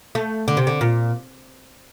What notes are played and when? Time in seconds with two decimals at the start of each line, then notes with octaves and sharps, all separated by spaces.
0.15 A3
0.48 D3
0.57 C3
0.67 D3
0.81 A#2